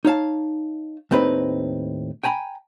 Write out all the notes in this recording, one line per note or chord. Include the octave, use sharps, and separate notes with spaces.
D#4 C#5 F5 A5
D#2 A2 C4 D#4 B4
G5 G#5 A#5 B5